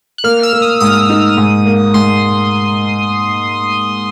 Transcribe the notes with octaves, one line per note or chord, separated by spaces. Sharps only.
F#6
A#3 F6
E6
A#3
D#6
G#2 D#6
D#4
G#2
A#3
G#2 C6